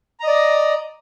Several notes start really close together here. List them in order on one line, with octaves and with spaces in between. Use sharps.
A#5 D#5 D5